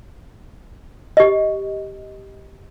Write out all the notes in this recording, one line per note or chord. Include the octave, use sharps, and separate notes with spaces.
G4 D#5